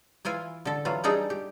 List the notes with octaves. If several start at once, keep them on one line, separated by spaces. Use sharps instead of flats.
E3 E4 F4 G#5
D3 A4
E3 F#3 F4
G3 D4 D#4 G#4 A4 A#5
G4